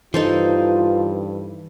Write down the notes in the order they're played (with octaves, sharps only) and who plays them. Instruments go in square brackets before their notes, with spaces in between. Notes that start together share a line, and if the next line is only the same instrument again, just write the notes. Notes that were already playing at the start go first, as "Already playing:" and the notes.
[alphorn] G2 [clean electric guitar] E3 [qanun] D#4 A4 C5 [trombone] F4